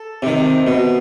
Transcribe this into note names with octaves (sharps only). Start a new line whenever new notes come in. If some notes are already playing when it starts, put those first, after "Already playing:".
Already playing: A4
C3 D#3
B2